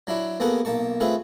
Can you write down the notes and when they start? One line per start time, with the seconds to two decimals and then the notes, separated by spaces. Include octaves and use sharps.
0.07 F#3 D4 E4 F#4
0.40 A#3 B3 F#4 G#4 A4 F#5
0.65 B1 A#3 A5 C#6
1.00 A3 C4 F4 G#4 B4 E5